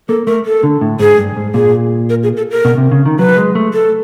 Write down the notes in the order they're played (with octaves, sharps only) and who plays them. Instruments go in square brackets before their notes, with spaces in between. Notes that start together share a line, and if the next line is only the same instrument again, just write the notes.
[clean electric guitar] A#3 [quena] A4
[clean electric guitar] A3 [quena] A#4
[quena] A4
[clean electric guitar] D3
A2
[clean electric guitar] G#2 [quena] G#4
[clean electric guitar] G2
G#2
[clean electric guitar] A#2 [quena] G#4
[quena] A#4
G#4
A4
A#4
[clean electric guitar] B2
C3
C#3
D#3
[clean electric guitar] F#3 [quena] B4
[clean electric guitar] G#3
A3
[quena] A4